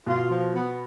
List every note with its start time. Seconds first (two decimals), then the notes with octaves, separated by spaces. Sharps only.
0.06 B2 F4
0.30 F3
0.54 B3